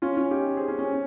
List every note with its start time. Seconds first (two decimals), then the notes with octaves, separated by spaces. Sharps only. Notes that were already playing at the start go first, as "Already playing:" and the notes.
0.02 C#4 F4
0.17 C#4 F4
0.31 D#4 G4
0.57 G#4 C5
0.68 C#4
0.79 C#4